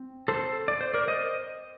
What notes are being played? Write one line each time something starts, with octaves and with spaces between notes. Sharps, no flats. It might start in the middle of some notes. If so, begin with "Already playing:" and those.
Already playing: C4
A4 C5
D5
C5
A#4 D5
C5 D#5